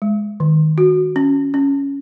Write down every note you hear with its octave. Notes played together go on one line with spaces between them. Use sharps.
G#3
D#3
F#4
C#4
C#4